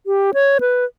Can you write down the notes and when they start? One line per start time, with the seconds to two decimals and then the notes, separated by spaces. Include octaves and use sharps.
0.07 G4
0.34 C#5
0.60 B4